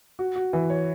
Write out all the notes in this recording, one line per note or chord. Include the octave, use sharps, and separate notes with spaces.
F#4
F#4
E3
C#5